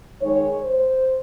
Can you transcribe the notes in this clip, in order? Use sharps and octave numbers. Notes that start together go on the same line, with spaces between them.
D#3 G#3 D#4 C#5
C5